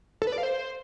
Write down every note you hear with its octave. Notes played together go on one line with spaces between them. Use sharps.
A4
B4
D5
F5
C5